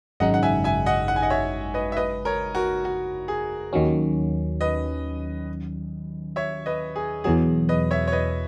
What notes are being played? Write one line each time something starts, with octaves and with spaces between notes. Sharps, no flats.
G#1 F#2 C#3 G#3 D#4 D#5 F#5
F#5
E5 G#5
E5 G#5
D#5 F#5
F#5
G#5
D#5 F#5
C#5 E5
B4 D#5
E5
B4 D#5
A#4 C#5
F#4 A#4
F#4
G#4
D#2 D#3 F#3 C#4
B4 D#5
C#5 E5
B4 D#5
G#4
E2 B2 F#3 G#4
B4 D#5
C#5 E5
C#5
B4 D#5